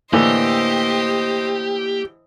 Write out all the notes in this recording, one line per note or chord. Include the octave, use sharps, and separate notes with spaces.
A2 D3 E3 A#3 G4 C5 D#5